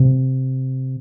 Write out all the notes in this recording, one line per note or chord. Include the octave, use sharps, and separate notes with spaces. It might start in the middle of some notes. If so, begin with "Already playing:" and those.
Already playing: C3